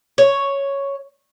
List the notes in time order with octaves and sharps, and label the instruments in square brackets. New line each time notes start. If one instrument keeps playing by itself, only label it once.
[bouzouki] C#5